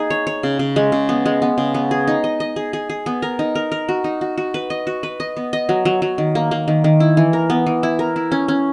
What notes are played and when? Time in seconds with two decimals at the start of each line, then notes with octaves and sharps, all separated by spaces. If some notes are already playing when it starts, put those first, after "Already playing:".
Already playing: A#3 D#4 G#4
0.10 C#5
0.27 C#5
0.43 C#3
0.59 C#3
0.76 G#3
0.92 C#3
1.09 B3
1.26 G#3
1.42 B3
1.58 C#3
1.74 B3
1.91 G#4
2.08 D#4
2.24 D#5
2.40 D#5
2.56 G#4
2.73 G#4
2.90 G#4
3.06 B3
3.22 A#4
3.39 D#4
3.55 A#4
3.72 A#4
3.89 F#4
4.04 D#4
4.21 F#4
4.38 F#4
4.54 B4
4.70 D#5
4.87 F#4
5.03 B4
5.20 D#5
5.37 B3
5.53 D#5
5.69 F#3
5.85 F#3
6.02 F#3
6.18 D#3
6.35 A#3
6.51 A#3
6.68 D#3
6.84 D#3
7.00 E4
7.17 E3
7.33 A#4
7.50 B3
7.67 E3
7.83 E4
7.99 A#4
8.16 E4
8.32 C#4
8.48 C#4